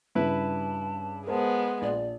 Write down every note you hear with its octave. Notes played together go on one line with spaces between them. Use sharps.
G2 C#3 E4 B4 A5
G#3 B3 A#4 C5 A5
A#1 D5